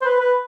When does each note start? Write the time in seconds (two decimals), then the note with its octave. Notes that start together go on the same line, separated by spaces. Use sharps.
0.02 C5
0.05 B4
0.20 B4